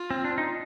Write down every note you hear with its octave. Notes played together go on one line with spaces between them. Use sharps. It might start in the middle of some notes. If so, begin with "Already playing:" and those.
Already playing: F4
C4
D4
D#4